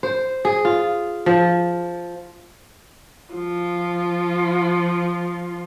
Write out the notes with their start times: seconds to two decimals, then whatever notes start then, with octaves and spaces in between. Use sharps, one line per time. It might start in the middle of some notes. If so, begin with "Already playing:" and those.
0.03 C5
0.45 G#4
0.65 F4
1.26 F3
3.34 F3 F4